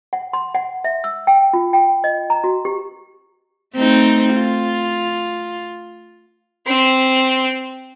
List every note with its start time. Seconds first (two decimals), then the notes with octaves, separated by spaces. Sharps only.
0.13 F#5
0.33 C6
0.55 F#5
0.84 E5
1.04 E6
1.27 G5
1.53 F4
1.73 G5
2.04 D#5
2.30 A#5
2.44 F#4
2.65 G4
3.75 A3 C4 D#4
4.34 F4
6.67 C4 C5